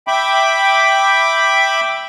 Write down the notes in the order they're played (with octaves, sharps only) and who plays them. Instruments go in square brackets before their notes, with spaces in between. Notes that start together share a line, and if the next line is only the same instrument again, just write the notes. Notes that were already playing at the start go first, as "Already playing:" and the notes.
[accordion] E5 G5 B5 D6